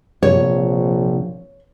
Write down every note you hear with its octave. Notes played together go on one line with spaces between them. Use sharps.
A#1 C3 F3 C#5